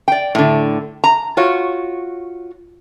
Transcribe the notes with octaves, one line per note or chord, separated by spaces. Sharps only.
D5 G5
A2 D3
A#5
F4 F#4 C#5